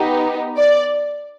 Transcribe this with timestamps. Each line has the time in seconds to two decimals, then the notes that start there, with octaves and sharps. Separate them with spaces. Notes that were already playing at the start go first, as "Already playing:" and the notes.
Already playing: B3 D#4 G4
0.57 D5